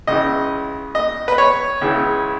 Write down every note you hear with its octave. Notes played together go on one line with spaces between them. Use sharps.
C#2 C#3 E3 D#5
D#5
B4
C#5
C#2 C#3 E3